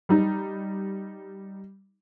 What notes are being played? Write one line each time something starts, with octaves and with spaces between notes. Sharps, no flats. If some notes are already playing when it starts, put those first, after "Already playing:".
G3 D#4